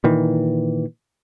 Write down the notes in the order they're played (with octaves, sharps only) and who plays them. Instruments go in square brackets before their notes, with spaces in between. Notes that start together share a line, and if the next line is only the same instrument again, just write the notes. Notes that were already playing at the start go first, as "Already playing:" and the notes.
[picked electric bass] A#2 D#3 E3